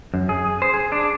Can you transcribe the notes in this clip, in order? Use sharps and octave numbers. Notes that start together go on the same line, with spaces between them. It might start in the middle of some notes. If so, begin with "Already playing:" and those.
F#2
G#4
C5
G#4
D4